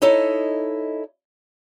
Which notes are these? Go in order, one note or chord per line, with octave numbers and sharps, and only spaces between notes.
D#4 E4 A4 C#5 D#5